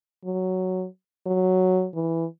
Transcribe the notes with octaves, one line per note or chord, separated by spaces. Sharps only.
F#3
F#3
E3